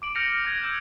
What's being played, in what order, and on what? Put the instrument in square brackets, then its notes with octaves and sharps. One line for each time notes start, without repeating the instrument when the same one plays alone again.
[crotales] D6 D7 F#7
F6 G6 A#6 C#7 D#7 F7
F6 F#6 G#6 A#6
E6 G6 E7